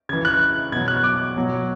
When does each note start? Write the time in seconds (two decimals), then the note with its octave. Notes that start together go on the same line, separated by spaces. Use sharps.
0.09 C#3 E3 G#6
0.25 F#6
0.72 B2 F#3 G#6
0.88 F#6
1.04 D6
1.36 B2 F#3